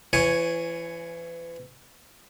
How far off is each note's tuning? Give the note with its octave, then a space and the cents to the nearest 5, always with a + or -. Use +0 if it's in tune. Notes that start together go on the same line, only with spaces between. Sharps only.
E3 +35 C#5 +0 G#5 +0